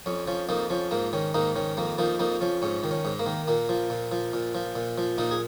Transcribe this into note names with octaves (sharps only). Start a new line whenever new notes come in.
F2 C#4
F3 C#4
F2 A#3 D#4
F3 C#4
G#2 A#3
D#3 C#4
G#2 A#3 D#4
D#3 C#4
F2 A#3
F3 A#3 D#4
F2 A#3 D#4
F3 C#4
G#2 C#4
D#3
C#4
G#2
A#3
D#3
A#2 A#3
F3
A#2
F3
A#2
F3
A#2
F3
A#2 A#3 D#4
G#4